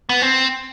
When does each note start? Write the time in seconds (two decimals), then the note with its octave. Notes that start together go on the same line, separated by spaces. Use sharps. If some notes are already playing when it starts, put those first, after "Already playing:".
0.09 B3
0.22 C4